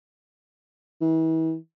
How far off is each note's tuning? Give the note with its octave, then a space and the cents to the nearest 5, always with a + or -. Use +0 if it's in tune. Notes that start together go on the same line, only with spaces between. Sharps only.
E3 -35